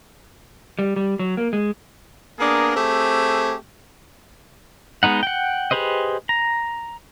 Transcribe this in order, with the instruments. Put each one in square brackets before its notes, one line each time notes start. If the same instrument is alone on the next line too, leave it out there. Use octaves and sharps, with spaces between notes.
[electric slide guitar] G3
G3
F#3
A#3
G#3
[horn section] A#3 B3 D4 G#4 A#4
A3 C4 G4 G#4
[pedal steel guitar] G#3 B3 D#4 F#5
F#5 G5
G4 G#4 B4 C5 D#5
A#5